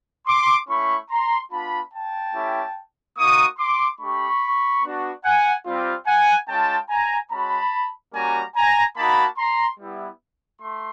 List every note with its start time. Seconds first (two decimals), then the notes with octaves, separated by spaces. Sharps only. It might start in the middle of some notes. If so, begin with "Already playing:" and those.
0.27 C6 D6
0.69 A3 C#4 E4 B5 C#6
1.10 A#5 C6
1.51 B3 D4 F4 A5 B5
1.93 G5 A5
2.34 A3 C#4 E4 G4
3.17 A#3 D#4 F#4 C#6 D#6
3.58 C6 D6
4.00 A3 D4 G4 B5 C#6
4.83 B3 D4 F#4
5.24 F#5 G#5
5.65 G3 C4 F4
6.06 F#5 G#5
6.48 G#3 C#4 F4 G5 A5
6.89 G#5 A#5
7.31 G#3 C#4 F#4 A5 B5
8.13 G3 A#3 C#4 F#4 G#5 A#5
8.55 G#5 A#5
8.96 A#3 D#4 F#4 A5 B5
9.38 A#5 C6
9.79 G3 B3 E4
10.61 A3 C6